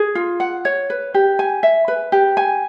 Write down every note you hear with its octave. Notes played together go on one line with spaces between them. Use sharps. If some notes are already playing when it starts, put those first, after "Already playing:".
Already playing: G#4
F4
F#5
C#5
B4
G4
G#5
E5
B4
G4
G#5